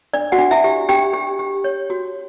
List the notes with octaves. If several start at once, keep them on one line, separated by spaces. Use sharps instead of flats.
D4 D5
F#4 F#5
D4
E4 E5
G4
D4 G4 G5
G4
G4
C#5
F#4